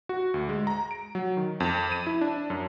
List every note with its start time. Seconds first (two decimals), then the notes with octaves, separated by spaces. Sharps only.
0.09 F#4
0.34 D2
0.49 G#3
0.67 A#5
0.91 D7
1.15 F#3
1.37 D#3
1.60 F2
1.92 D#7
2.07 E4
2.21 D4
2.50 F#2